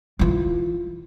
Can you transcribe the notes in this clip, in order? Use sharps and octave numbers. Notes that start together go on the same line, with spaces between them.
E3 F4